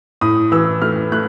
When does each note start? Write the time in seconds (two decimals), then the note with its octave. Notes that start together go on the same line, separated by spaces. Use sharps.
0.21 A2 D#6
0.52 E3 E6
0.82 A3 F6
1.12 A3 F#6